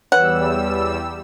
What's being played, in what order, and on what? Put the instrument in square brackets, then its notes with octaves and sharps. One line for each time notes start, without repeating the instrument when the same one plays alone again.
[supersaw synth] E2 G3 E6 [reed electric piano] B4 C#5 [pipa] F#5